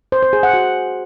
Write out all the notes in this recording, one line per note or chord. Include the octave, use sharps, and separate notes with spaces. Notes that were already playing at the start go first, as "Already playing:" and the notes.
C5
C5
G#4
F#5
F#4